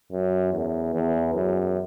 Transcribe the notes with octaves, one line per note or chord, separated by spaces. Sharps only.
F#2
E2
E2
F#2